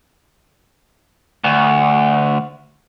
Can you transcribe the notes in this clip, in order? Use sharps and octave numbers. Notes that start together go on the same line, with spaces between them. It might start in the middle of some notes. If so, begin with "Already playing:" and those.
D2